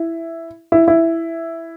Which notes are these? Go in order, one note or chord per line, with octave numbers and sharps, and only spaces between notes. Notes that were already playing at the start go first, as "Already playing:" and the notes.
Already playing: E4
E4
E4